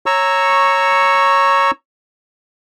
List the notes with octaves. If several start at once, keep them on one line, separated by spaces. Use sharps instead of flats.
C#5 A#5 C#6 E6